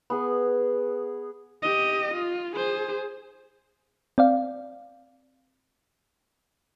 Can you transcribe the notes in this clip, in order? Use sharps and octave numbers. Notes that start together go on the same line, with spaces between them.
B3 G#4
G4 D#5
F4
G#4 C5
C4 D5 F5